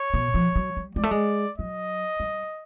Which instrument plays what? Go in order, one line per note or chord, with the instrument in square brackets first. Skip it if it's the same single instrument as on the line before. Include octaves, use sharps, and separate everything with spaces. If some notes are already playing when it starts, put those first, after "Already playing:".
Already playing: [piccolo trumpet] C#5
[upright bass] B2
F3
F#3
G3
[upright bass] G#3 [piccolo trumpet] D5
[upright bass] A3
G#3
[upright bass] F#3 [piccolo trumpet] D#5
[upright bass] G3